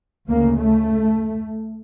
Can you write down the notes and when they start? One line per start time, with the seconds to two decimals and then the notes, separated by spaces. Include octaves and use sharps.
0.27 D2 C#3 A#3
0.55 A3